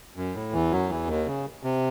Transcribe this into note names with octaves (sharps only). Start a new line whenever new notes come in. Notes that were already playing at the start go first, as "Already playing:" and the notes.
F#2
A2
E2 E3
F#2 F#3
E2 E3
D#2 D#3
C#3
C3